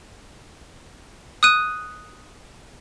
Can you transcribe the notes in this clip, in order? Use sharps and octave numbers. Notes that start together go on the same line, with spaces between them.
D#6 F#6 D#7